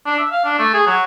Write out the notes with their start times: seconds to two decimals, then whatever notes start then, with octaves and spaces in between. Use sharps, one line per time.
0.06 D4
0.19 E5
0.32 F5
0.45 D4
0.59 A3
0.74 G#4
0.87 F#3